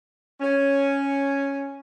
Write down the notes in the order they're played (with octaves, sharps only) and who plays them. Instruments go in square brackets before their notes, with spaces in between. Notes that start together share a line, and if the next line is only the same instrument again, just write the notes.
[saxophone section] C#4